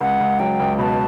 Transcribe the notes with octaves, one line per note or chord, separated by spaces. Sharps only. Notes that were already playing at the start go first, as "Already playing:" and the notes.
C#2 F#5
C#2
F#3 G5
C#2
B2 A5 B5